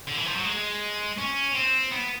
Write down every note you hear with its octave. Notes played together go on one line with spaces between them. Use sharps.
D3
E3
F3
F#3
G#3
C#4
C4
B3